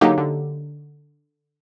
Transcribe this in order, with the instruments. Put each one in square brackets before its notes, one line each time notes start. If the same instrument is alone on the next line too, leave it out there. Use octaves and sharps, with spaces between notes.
[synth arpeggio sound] D3 F#3 A#3 D#4 G4
D3